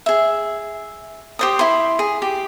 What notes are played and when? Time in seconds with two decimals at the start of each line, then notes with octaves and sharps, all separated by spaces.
0.06 G#4 E5
1.39 G4 C5 D#6
1.59 E4 C6
1.99 G#4
2.22 G4